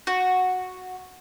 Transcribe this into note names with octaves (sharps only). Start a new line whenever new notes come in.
F#4